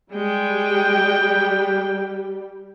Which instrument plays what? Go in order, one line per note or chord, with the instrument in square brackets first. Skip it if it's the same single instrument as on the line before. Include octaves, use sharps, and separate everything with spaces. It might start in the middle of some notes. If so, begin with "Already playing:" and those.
[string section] G3 [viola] G#3 G5